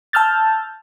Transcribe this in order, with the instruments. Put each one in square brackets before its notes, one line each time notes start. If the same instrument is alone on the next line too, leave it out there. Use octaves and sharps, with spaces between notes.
[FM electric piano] A5 E6 F6 G6 A6